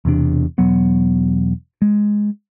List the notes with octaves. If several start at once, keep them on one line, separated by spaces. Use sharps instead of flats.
E1 E2 C3 D4
E1 F#3 B3
G#3